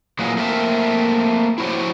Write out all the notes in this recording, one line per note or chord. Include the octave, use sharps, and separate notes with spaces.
A#2 E3 F#3 G#3 A#3
A3 A#3 C4 A#4 E5
E4 F#4 C5 C#5